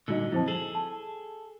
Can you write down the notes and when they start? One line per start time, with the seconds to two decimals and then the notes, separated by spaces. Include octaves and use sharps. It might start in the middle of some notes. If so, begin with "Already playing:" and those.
0.08 G2 A#2 D3 D#4 F#4 D#5
0.32 F2 E4 C5 A5
0.48 G#4 A4 F#7
0.75 A5